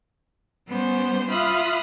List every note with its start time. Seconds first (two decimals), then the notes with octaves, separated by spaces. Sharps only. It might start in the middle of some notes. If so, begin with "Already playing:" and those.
0.68 G3 B3 C#4 C5
1.30 F4 E5 F5 B5 D#6 F#6